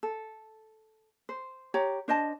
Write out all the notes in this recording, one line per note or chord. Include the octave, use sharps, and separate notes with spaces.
A4
C5
G4 C#5 A#5
D4 C5 D#5 A5